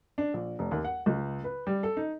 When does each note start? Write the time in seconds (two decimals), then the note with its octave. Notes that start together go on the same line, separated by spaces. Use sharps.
0.18 D4
0.34 A#1
0.59 F1
0.71 D#2
0.85 F#5
1.06 C#2
1.44 B4
1.67 G3
1.83 A4
1.97 D#4